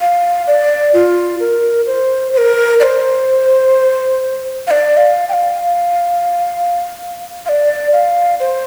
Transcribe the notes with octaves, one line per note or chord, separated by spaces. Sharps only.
F5
D5
F4
A#4
C5
C5
A#4
D5
C5
F5
D5
F5
G5
F5
F5
D5
F5
C5